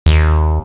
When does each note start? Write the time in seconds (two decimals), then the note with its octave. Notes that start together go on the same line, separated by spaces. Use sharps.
0.06 D#2